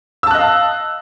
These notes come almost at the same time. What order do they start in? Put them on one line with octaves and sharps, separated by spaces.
E6 A5 F#6 D#5 F5